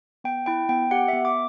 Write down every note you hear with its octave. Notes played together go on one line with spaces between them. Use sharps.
B3 G5
E4 G5
B3 G5
G4 F#5
E5
B3
D6